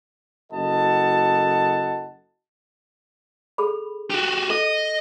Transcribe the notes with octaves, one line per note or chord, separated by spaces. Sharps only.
F#1 F#4 A4 D#5 F#5 A5
G#4 A4 B5
F#4 G4
A4 D#5